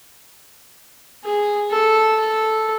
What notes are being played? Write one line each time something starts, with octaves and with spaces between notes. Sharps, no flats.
G#4
A4
A4